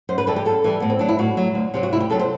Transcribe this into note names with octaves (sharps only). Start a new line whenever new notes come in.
F#2 C5
B4
E3 G3 A4
G4
F#2 A4
E3 G3
A2 B3
C4
F#3 D4
E4
A2 F#4
F#3
D2
C3 F#3 G4
F#4
D2 E4
G4
C3 F#3 A4
C5